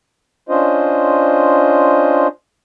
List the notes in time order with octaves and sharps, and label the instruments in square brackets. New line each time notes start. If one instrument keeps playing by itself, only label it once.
[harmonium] C#4 D4 F4 C5 D#5